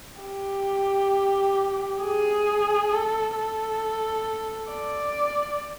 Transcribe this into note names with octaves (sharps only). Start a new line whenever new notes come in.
G4
G#4
A4
A4
D5